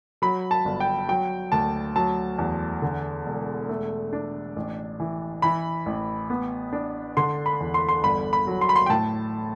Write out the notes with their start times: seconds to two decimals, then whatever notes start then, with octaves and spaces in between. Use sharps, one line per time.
0.22 F#3 B5
0.51 A5
0.65 G1
0.80 G5
1.08 F#3 G5
1.52 D2 A5
1.96 F#3 A5
2.38 E2
2.82 D3
3.26 E1
3.69 A3
4.13 D4
4.56 A1
5.00 E3
5.42 E3 B5
5.86 A1
6.30 B3
6.73 D4
7.17 D3 C6
7.46 B5
7.60 E2
7.74 C6
7.89 C6
8.03 G1 B5
8.33 B5
8.47 F#3
8.61 C6
8.69 B5
8.76 C6
8.86 G5
8.90 A2 A5